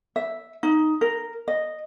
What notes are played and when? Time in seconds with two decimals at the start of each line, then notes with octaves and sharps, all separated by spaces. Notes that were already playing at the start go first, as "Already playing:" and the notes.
0.16 E5
0.63 D#4
1.01 A#4
1.48 D#5